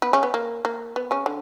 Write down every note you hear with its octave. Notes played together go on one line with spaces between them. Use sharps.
B3 B4
C#3 C#4
B3
A#3
A#3
B3
C#3 C#4
D3